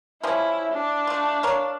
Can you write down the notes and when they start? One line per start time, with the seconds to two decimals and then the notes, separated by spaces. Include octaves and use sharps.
0.23 F3 G3 C#4 E4
0.73 D4
1.07 A3 F4
1.43 A#4 C#5 F5